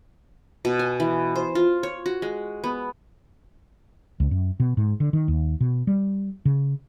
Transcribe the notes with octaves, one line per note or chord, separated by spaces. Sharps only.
B2
G#5
E3
C5
F4
C#5
F#4
G#3
B3
C#2
F#2
B2
G#2
D3
D#3
D#2
B2
G3
C#3